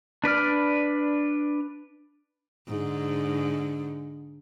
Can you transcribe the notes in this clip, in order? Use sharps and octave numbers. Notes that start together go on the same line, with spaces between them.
D4 B4 D5 F6
G#2 D3